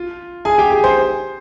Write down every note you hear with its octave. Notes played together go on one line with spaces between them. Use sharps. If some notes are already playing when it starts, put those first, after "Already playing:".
Already playing: F4
G#4 G#5
G4 G5
G#4 G#5
C5 C6